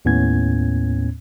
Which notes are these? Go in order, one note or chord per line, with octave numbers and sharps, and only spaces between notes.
D#2 A2 B3 C#4 G#6